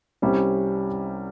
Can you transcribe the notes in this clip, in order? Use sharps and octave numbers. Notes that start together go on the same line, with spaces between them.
C2 C3 G3 C#4